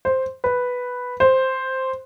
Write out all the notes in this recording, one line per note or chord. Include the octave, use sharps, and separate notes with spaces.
C5
B4
C5